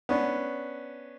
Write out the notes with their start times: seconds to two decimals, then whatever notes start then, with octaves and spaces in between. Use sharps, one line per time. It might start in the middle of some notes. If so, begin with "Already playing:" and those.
0.09 B3 C#4 D4